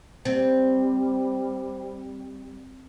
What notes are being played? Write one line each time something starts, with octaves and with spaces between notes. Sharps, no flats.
G3 C4